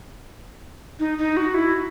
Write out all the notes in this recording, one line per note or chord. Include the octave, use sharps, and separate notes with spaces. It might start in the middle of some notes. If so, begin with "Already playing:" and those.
D#4
D#4
F#4
E4